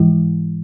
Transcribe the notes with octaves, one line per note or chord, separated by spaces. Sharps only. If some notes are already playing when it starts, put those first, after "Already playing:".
Already playing: G#2 E3 G#3 E4